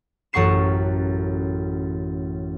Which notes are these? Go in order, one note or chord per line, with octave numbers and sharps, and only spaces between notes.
A1 F#2 F#5 C#6 C7 E7